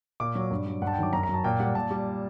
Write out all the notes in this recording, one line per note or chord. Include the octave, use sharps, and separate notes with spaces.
A#2 D6
F#3
G2
F#3
G2 F#5
A5
G5
D#3 F#3 D6
F#2 A#5
A#5
F#3 A5
A#2 G5
G3 F#5
A#2 A5
G3